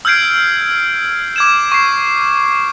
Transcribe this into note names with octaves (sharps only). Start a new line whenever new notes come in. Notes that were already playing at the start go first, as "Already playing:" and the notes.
E6 F6 G6 G#6 C7 D7
D6 G#6 E7
C#6 C7